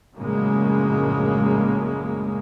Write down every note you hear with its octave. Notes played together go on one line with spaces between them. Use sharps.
A#1 F#2 A2 C#3 G#3 A#3